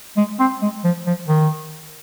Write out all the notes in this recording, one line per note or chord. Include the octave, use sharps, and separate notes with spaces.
G#3
C4
G#3
F3
F3
D#3